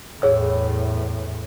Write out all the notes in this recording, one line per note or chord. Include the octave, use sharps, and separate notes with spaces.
E2 A2 G#4 C#5 E6